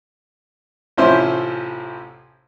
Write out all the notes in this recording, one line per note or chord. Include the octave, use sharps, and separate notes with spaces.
A1 C3 F3 C#4 E4 C5